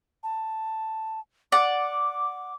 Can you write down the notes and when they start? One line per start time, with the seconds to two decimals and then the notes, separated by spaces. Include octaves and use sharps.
0.23 A5
1.52 D5 F#5 D6